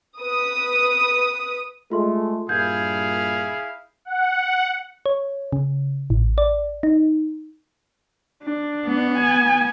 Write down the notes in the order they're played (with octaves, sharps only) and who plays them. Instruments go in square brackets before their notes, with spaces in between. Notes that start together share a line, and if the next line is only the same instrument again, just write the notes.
[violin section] B4 D#6
[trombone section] G#3 A3 [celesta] F4 C6
[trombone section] G2 A#2 [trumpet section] E4 G#4 F5 [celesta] G6 G#6
[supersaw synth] F#5
[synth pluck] C#5
C#3
A1
D5
D#4
[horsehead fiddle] D4
[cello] B3
[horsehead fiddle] G#5